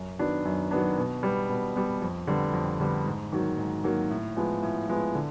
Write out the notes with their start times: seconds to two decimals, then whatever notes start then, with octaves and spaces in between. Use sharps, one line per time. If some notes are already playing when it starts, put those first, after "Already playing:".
Already playing: F#2
0.19 D#3 F#3 B3 D4
0.45 F#2
0.71 D#3 F#3 B3 D4
0.97 B2
1.23 G3 B3
1.49 B2
1.76 G3 B3
2.02 F2
2.27 D3 G3 B3
2.53 F2
2.80 D3 G3 B3
3.06 G#2
3.33 D#3 F#3 A#3
3.58 G#2
3.84 D#3 F#3 A#3
4.10 A2
4.36 F3 G#3 B3
4.63 A2
4.89 F3 G#3 B3
5.15 D3